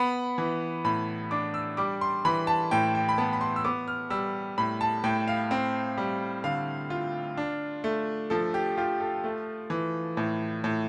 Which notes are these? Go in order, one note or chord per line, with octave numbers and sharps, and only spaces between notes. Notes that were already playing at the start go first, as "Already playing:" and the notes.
Already playing: B3 B5
E3
A2 B5
D4 D6
E6
G3 D6
C6
E3 B5
A5
A2 G5
G5
B5
B3 A5
B5
C6
E6
B3 D6
F6
G3 E6
A2 B5
A5
A2 G5
F5
C4
G3
D3 F5
F4
D4
A3
F3 A4
G4
F4 G4
A4
A3
E3
A2
A2